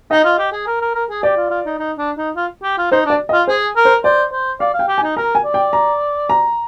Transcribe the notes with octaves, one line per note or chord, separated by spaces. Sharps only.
D#4 D#5
F4
G4
G#4
A#4
A#4
A#4
G#4
G4 D5
F4
F4
D#4
D#4
D4
D#4
F4
G4
F4
D#4 C5
D4 D5
D#5
F4
G#4 C5
A#4
C5
C5 D5
C5
D5 F5
F5
G5
G4
G#5
D#4
A#4 A#5
G#5
D5
G5
A#5
A#5